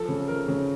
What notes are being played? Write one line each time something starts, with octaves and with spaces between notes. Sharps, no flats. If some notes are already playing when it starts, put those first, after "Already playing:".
Already playing: F3 A4
C#3
F3 A#4
C#3